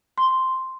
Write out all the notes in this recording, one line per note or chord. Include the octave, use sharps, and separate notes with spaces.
C6